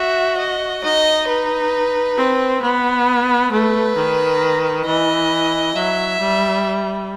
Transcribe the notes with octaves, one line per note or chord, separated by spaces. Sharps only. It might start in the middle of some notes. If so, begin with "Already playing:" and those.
Already playing: F#4 E5
D#5
D#4 D#5
B4
C4
B3
A3 B4
D#3
E3 D#5
F#3 E5
G3